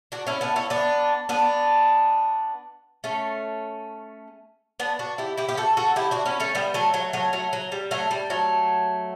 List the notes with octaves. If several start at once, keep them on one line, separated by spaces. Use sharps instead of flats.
D4 F#4
C#4 E4
B3 D4
C#4 E4
B3 D4
B3 D4
A3 C#4
B3 D4
D4 F#4
E4 G4
E4 G4
G4
F#4 A4
F#4 A4
E4 G4
D4 F#4
C#4 E4
A3 C#4
G3 B3
F#3 A3
F#3 A3
F#3 A3
F#3 A3
F#3
G3
F#3 A3
G3
F#3 A3